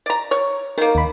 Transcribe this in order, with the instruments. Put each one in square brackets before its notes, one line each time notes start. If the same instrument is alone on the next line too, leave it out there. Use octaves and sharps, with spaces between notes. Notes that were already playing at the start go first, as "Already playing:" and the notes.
[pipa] D5 A#5
C#5
[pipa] D#3 A#3 [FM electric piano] A#4
[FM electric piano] D#2 B5